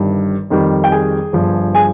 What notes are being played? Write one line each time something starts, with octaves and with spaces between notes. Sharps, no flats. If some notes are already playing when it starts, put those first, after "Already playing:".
Already playing: G1 G2 D#3 G3
F2 D#3 G3
G5
G#4 G#5
G1 G2 F3
G#4 G#5